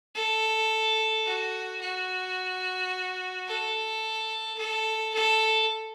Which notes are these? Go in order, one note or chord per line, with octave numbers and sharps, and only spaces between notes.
A4
F#4
F#4
A4
A4
A4